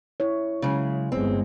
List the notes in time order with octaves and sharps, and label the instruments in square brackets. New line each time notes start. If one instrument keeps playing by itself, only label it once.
[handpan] E4 C#5
[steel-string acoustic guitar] C#3 G#3 [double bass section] F#3
[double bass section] G1 G#3 B3 [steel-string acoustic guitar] C4